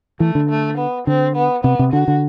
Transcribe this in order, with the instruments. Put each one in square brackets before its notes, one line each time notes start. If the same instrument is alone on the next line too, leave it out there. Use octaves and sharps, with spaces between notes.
[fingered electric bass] E3 [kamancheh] A3
[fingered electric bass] D3
[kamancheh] A3
B3
[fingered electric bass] D3 [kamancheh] C4
[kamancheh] B3
[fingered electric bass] C3 [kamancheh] B3
[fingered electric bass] C3
[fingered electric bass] D3 [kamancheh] F#4
[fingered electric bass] D3